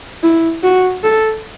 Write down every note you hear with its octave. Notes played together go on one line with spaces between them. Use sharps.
E4
F#4
A4